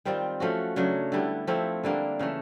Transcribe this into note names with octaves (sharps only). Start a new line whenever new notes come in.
D#3 G3 C4 F4
F3 A3 C#4 F#4
C#3 F#3 A3 D4
D3 G3 B3 E4
F3 A3 C4 E4
D3 G3 A#3 D4
C#3 E3 A3